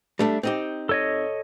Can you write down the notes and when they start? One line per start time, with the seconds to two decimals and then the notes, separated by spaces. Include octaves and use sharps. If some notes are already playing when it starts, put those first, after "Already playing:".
0.19 G3 A3 D4
0.43 C4 D#4 G4
0.89 A4 C#5 D#5